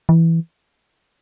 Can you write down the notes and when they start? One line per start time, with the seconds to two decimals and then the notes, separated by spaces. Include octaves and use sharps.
0.09 E3